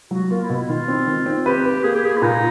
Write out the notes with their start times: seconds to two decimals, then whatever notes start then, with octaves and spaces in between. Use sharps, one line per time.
0.11 F#3 F#4
0.30 A#3 F4
0.44 E4
0.49 B2
0.56 E4
0.68 D#3 F4
0.88 C4
1.07 D#3
1.26 C4
1.46 G4 B4
1.65 B4
1.83 A#3 G#4
1.95 G4
2.03 A#3 G#4
2.17 E4
2.22 A#2 D#4